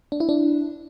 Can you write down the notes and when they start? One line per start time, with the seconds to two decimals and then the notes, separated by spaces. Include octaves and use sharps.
0.12 D4
0.20 E4
0.29 D4